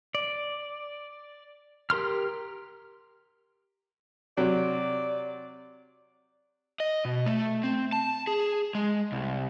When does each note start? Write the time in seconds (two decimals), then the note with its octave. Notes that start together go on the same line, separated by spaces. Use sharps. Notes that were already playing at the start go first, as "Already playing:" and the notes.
0.15 D5
1.90 G4 A#4 C6 F6
4.37 C3 F#3 D5
6.80 D#5
7.05 B2
7.26 A3
7.63 C4
7.93 A5
8.27 G#4
8.75 G#3
9.12 C2